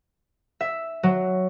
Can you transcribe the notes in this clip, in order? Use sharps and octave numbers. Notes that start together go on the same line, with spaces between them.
E5
F#3